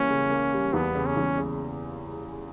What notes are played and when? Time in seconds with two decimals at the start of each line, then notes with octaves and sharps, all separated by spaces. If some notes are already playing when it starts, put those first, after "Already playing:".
Already playing: E3 G3 A#3 C#4
0.09 C#3
0.30 A#3
0.53 G3
0.73 E2 B3
0.95 C#3
1.06 C#4
1.17 E2
1.38 C#3